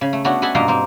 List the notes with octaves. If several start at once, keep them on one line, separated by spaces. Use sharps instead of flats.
C#3
A3
A3 B3 C#4 D4 F#4
B4 D#5 E5 F#5 G#5 A5
G2 B2 A#3 F4 D#5 F5
A#3 C4